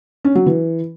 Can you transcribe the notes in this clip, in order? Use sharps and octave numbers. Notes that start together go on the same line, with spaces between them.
C#4
F#3
E3